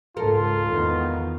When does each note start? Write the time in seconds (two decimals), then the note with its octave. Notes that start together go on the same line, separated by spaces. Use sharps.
0.17 C#2 G#2 F4 A4 A#4
0.70 E2 D#3 B3